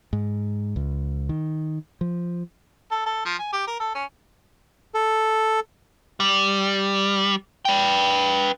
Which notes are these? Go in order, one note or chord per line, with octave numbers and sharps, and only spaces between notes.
G#2
C#2
D#3
F3
A4
A4
F3
G#5
G4
A#4
A4
C#4
A4
G3
B4 G5